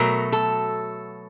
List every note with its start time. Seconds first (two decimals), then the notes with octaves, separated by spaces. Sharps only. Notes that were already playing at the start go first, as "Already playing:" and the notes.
Already playing: B2 F#3 A3 A#4
0.33 A4